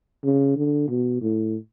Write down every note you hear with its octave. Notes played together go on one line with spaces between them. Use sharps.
C#3
D3
B2
A2